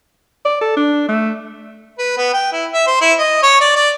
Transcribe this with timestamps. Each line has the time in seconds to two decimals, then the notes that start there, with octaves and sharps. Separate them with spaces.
0.45 D5
0.61 A4
0.77 D4
1.09 A3
1.99 B4
2.17 B3
2.34 G5
2.53 E4
2.74 E5
2.87 C5
3.01 E4
3.19 D#5
3.43 C#5
3.61 D5
3.76 D5